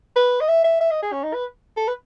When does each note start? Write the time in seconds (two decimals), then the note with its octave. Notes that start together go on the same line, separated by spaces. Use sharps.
0.16 B4
0.41 D#5
0.48 E5
0.64 E5
0.81 E5
0.91 D#5
1.02 G#4
1.12 C#4
1.23 D#4
1.34 B4
1.77 A4
1.88 B4